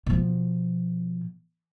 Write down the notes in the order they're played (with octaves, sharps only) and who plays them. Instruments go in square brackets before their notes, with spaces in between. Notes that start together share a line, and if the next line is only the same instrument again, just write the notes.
[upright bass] B2 F3